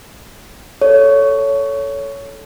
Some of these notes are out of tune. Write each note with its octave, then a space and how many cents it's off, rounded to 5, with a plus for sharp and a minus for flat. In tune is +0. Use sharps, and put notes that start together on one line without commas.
A4 +0 C#5 +15